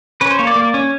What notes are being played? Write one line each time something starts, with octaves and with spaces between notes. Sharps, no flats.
C#4 B4
C5
A#3 C#5
D5
A#3
C#4